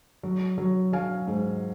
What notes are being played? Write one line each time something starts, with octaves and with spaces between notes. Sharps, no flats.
F#3
F#3
F#3 F5 G#5
G#2